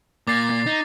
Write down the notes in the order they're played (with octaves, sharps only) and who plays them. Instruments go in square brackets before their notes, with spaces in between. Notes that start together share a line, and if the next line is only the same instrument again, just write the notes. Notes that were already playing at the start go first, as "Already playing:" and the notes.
[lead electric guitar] A#2 A#3 [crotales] D6 A6 C7
[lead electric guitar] A#2
D#4